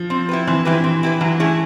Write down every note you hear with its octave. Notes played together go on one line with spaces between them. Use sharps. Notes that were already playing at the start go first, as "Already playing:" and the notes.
Already playing: F3
C4
E4 G4 B4
E3 C4
E3 E4 G4 B4
C4
E4 G4 B4
E3 F#3
A3 C#4 E4 G#4